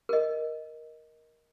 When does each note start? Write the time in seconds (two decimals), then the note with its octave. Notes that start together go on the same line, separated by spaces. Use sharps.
0.09 A#4 D#5